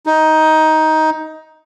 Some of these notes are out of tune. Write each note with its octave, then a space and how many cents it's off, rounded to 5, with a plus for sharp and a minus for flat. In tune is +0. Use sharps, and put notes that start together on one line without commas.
D#4 +15